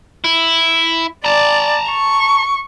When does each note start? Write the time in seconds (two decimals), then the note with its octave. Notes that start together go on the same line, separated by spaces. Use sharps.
0.24 E4
1.25 D5 A5 A#5
1.90 C#6